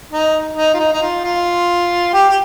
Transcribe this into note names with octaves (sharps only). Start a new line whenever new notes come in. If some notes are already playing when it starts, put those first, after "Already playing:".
D#4
D#4
F4
D#4
D#4
F4
F4
G4
G4